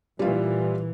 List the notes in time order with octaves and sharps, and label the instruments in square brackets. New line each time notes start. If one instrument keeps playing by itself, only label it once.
[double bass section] A#2 E3 [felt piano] G3 F4